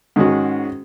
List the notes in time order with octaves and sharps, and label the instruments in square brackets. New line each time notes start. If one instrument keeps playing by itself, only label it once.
[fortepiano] G#2 D#3 G#3 C#4 F#4